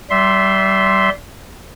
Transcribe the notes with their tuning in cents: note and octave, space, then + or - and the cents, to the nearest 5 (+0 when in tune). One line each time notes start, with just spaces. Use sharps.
G3 -25 E5 +0 C6 +0